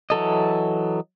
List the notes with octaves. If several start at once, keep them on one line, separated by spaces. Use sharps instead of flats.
E3 F#3 A4 D#5